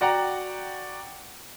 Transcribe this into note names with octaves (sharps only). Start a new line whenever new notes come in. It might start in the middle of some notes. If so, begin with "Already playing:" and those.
F#4 D5 F#5 G5 A#5